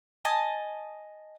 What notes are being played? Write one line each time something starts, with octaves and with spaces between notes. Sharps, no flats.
D#5 G#5 A5 D#6